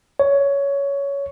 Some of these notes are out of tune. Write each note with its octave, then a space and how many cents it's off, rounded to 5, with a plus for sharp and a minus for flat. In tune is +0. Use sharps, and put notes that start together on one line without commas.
C#5 +15